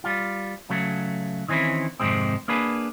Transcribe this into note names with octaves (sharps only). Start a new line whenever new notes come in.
G3 F4
C#3 F#3 A3
D#3 E3 C4 C#4 E4
F2 G#2 C3 D#3 G#3 C4
A#3 D4 G#4 B4